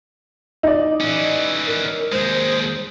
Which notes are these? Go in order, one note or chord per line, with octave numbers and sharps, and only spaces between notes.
D#4 D5
E3 C#4
A#4
D#2 G#3 C5